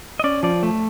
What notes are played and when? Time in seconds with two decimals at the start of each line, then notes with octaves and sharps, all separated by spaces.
0.20 D#5
0.24 C#4 D5
0.43 F3 D5
0.63 A3